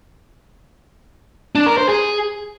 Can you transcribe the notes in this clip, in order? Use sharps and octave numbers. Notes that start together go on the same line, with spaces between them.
D4
A#4
C5
G#4